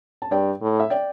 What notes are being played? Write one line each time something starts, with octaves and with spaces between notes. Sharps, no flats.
A5
G2 D5 G5
A2
E5
D5 G5